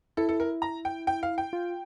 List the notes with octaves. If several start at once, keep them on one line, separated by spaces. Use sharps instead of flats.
E4 A4
A4
A#4
A#5
G5
G5
F5
G5
F4